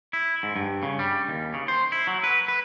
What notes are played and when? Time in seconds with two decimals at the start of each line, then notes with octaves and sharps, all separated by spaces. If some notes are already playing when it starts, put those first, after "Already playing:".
0.13 E4
0.43 G#2
0.56 G2
0.83 C#3
0.99 G3
1.28 D#2
1.54 C#3
1.68 C5
1.92 E4
2.07 F#3
2.24 B4
2.48 B4